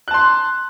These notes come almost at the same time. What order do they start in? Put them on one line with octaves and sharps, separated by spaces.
F#6 A5 C6